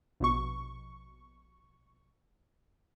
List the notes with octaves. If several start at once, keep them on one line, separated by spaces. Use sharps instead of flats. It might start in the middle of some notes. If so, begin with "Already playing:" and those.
A#1 B2 C#6